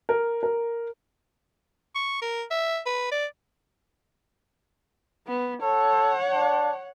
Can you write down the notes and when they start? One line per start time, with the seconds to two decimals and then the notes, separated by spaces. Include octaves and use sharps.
0.09 A#4
0.43 A#4
1.95 C#6
2.22 A#4
2.51 E5
2.86 B4
3.12 D5
5.27 B3
5.62 A4 C#5 F#5
6.33 D4